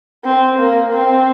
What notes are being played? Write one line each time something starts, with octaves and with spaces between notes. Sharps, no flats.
C4
A#3
C4